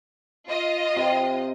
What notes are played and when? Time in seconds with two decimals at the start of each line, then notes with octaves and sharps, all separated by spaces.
0.49 F4 D#5
0.96 C3